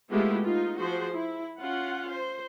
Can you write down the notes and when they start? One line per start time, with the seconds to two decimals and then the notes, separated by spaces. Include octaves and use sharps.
0.11 G#3 A3 B3 E4 F4 G4
0.42 D#4 F4
0.78 F3 F#4 G#4 C5
1.13 E4
1.60 C#4 F4 F#5
2.11 C5